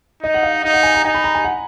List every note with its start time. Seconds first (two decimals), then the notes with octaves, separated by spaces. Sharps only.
0.23 D#4 D#5
0.34 F#5
0.43 F5
0.64 D#4 F5
0.74 F#5
0.83 G#5
0.94 A#5
1.04 D#4 G#5
1.15 B5
1.24 A#5
1.35 G#5
1.45 F#5